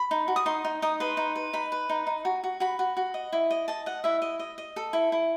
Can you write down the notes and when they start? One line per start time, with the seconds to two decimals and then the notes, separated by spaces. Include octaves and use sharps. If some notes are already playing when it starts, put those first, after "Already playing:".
Already playing: B5
0.11 D#4
0.28 F#4
0.36 D#6
0.46 D#4 C6
0.64 D#4
0.82 D#4 D#6
1.00 B4 C6
1.17 D#4
1.36 B4
1.53 D#4 B5
1.72 B4
1.89 D#4
2.07 D#4
2.25 F#4
2.44 F#4
2.60 F#4 B5
2.79 F#4
2.97 F#4
3.14 D#5
3.32 E4
3.51 D#5
3.68 D#5 A5
3.86 D#5 F#5
4.04 E4 E5
4.22 D#5
4.39 D#5
4.58 D#5
4.76 A4
4.93 E4
5.12 E4